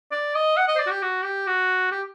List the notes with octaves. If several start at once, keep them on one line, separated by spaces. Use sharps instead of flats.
D5
D#5
F#5
D#5
C5
D5
F#4
G4
F#4
G4
F#4
G4